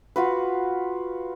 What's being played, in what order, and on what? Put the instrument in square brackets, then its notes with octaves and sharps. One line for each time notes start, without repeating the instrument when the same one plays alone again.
[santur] F4 F#4 B4